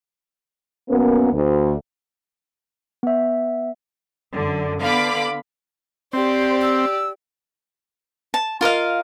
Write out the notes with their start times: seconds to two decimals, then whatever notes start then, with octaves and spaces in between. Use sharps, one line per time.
0.89 F#2 A#3 B3 C#4
1.33 D2
3.03 B3 E5
4.33 F#2 D3
4.81 D3 B3 F5 B5 D6
6.13 C4 G4 C5 D5
6.62 E6
8.34 A5
8.61 F4 A#4 D#5 F5